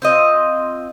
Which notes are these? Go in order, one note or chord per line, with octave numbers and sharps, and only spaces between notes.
C4 F4 D#5